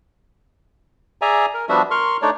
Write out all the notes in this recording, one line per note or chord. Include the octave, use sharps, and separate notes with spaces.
G#4 D5 E5 G#5 A#5
A#4
F3 G3 B3 D4 F#4 E5
A#4 C6 C#6 F6
A3 D4 D#4 C#5 D5